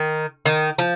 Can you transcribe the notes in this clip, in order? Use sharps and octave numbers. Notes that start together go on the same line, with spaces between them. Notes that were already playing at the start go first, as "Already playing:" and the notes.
Already playing: D#3
D#3
F3